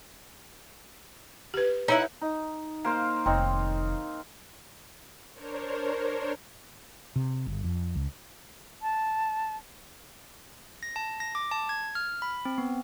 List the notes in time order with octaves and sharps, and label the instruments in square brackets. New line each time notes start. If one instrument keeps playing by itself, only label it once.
[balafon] G4 B4
[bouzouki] D#4 E4 F#5 [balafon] C#5
[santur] D#4
A#3 C5 F5
[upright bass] F1 D#3 [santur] C4 D#4 C#5
[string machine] D4 A#4 C5 C#5
[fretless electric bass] C3
G1
F2
C#2
[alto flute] A5
[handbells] A#6
A5
A#6
D6
A5
G#6
F6
B5
C4
B3